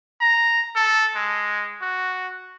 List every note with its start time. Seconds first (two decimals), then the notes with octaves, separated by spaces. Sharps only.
0.21 A#5
0.76 A4
1.16 G#3
1.81 F#4